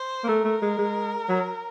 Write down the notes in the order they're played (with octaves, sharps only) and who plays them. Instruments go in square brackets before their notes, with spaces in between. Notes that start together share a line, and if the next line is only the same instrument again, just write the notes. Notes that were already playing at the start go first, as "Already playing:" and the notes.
Already playing: [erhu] C5
[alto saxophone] A#3
[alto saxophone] A3 [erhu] A#4
[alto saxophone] A3
G#3
G#3
F#3